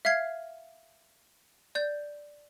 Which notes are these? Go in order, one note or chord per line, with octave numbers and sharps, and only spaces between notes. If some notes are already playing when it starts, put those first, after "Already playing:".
E5 F5 F6 G#6 C7
D5 G6